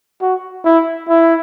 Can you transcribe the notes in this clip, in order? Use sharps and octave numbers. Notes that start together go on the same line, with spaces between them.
F#4
E4
E4